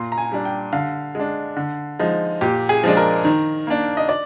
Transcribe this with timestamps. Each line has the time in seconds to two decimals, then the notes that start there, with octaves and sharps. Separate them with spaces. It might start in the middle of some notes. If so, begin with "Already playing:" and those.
Already playing: A#2 C6
0.12 A#5
0.18 G#5
0.32 G3 D4
0.45 G5
0.73 D3 F5
1.15 G#3 D4
1.57 D3
1.99 F3 G#3 D#4
2.41 A#2 G4
2.69 G#4
2.84 F3 G#3 D4
2.97 A#4
3.25 D#3
3.67 A#3 D4
3.97 D#5
4.09 D5